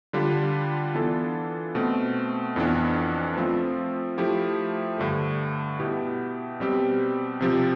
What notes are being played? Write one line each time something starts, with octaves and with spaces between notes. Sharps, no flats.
D3 G3 D4 F4
E3 B3 D4 F4 A4
B2 A3 C4
F2 E3 B3 D4
F3 A3 C4 F4
F3 A3 E4 G4
G2 D3 A3
B2 B3 E4 G4
B2 G3 C4 G4
C3 F3 C4 G4